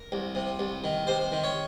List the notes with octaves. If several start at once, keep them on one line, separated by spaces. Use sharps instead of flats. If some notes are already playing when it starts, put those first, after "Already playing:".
Already playing: A#4
C2
C3
C2
D#3
C3 C5
D#3
C#5